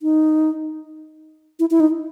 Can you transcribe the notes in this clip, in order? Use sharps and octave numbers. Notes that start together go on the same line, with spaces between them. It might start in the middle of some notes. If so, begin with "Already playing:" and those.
D#4
E4
E4
D#4